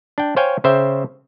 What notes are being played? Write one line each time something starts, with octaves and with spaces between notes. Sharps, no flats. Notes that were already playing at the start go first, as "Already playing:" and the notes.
D4 G5
C5 C#5 F5 G5 G#5
C#3 C5 E5 G5